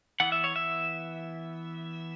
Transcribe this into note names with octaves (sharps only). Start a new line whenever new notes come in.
E3 B3 F#5
E5
C#5
E5